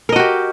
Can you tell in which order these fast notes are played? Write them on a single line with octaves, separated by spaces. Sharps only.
A#4 D#5 F#4 G4